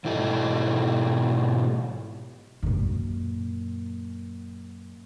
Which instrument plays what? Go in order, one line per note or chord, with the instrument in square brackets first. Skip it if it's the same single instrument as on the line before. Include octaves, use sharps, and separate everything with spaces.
[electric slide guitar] G#2 B2 E4 G4 A4 D#5
[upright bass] F#2 A#2